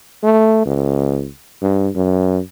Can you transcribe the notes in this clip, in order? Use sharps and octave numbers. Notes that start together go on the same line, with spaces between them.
A3
C#2
G2
F#2